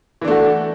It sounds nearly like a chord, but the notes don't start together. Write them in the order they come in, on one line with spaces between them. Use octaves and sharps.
E3 D4 A3 F#4